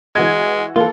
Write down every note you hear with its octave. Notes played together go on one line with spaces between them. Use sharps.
E3 G#3 F#4 G#6
E3 A#3 F4 A4